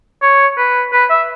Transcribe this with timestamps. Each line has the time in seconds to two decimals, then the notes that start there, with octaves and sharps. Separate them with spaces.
0.23 C#5
0.58 B4
0.93 B4
1.10 E5